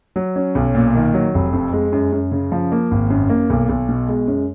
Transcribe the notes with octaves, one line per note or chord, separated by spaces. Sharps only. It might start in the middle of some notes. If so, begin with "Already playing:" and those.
F#3
C#4
B1
A#2
D#3
F#3
F1
F2
G#3
F#2
F#2
C#3
F3
A#3
G#1
F#2
A#3
B1
B1
B2
G#3
F#2